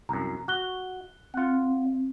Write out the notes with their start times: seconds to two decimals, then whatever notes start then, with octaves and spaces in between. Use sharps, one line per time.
0.09 C2 F#2 A#5
0.48 F#4 F#6 G7
1.34 C4 F4 F#5